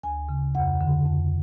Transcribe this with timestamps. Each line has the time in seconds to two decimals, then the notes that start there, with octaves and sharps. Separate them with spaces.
0.03 D2 G#5
0.29 C#3
0.55 F2 F#5
0.81 D3
1.06 F2